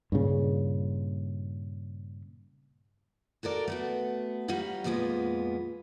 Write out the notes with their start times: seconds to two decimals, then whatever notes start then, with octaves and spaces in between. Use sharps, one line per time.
0.12 G2 A#2 C#3
3.43 F#4 A4 A#4 D5
3.68 A3 B3 F#4
4.48 G3 C#4 D#4 F4 F#5
4.84 F2 A#2 F3 G#3 B3